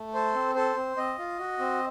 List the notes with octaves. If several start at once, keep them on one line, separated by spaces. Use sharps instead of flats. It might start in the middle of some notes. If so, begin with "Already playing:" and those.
Already playing: A3
A4 C5
C4
A4 C5
C4
C4 D#5
F4
F#4
C4